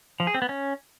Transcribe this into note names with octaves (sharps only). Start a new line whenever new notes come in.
F3
G#4
C4
B3
C#4